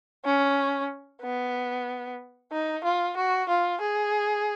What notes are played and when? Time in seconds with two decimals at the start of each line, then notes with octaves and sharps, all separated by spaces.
0.25 C#4
1.22 B3
2.52 D#4
2.84 F4
3.17 F#4
3.49 F4
3.81 G#4